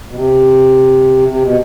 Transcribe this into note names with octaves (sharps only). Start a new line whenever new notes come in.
B2
C3
C3
B2